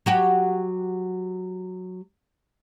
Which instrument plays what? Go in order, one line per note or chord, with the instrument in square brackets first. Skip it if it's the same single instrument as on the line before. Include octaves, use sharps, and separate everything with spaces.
[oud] F#3 F#4 G4